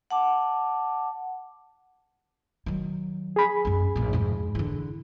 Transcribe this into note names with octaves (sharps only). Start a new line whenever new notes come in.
F#5 A5 D6
D#3 F#3
G#4 B5
F#2 C#4
A#1 A#2
F2 G#2
D3 E3